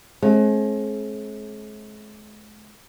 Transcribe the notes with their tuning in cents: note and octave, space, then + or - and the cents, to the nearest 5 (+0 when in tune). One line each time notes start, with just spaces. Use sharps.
G#3 +40 C4 +45